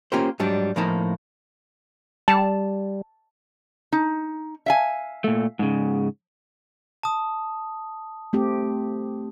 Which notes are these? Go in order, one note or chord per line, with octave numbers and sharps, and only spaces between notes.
A#3 C#4 F4 G4 A#4 C5
G#2 F#3 G3 D4
A2 F3 A#3 D#4 A5
G3 A5
D#4
E5 F5 G#5
A#2 A3
G#2 C#3
A5 D#6
A3 C4 G4